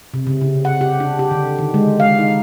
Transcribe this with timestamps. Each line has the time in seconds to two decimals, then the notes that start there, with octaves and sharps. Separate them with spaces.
0.14 C3
0.27 C#3
0.41 C#3
0.65 F#5
0.81 G4
1.00 D4
1.19 G4
1.31 D3
1.59 D#3
1.74 G#3
2.00 F5
2.19 D#4